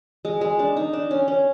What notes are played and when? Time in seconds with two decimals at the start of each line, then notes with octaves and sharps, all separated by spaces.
0.25 G#3
0.41 G#3
0.59 D4
0.77 D#4
0.93 D4
1.11 C#4
1.28 C#4